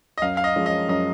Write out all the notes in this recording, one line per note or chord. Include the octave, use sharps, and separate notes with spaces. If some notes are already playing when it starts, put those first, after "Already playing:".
D#5
F#2 F5
F5
D#5
F3 G#3 C#4 F4
D#5
F#2 D#5